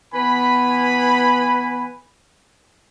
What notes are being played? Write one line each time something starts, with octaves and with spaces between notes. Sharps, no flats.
E3 B3 B4 G#5 B5